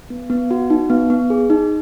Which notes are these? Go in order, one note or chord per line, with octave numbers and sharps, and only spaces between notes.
B3
B3
F#4
D#4
B3
B3
G#4
D#4